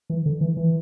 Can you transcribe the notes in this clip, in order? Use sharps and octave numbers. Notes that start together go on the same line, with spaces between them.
E3
D3
E3
E3